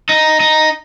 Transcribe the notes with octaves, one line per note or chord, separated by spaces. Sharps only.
D#4
D#4